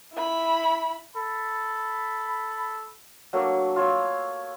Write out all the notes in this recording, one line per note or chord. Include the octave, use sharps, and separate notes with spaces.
E4 B5
A4 B5
F#3 A3 A#3 D4
F4 C#5 E6